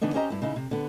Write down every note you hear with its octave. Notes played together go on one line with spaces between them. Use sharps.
D3 E3 B3 D4 D#4
C#4 G4 C5 D#5 F#5 A#5
G2 E4
C#3 D#4 E4
C3
D3 B3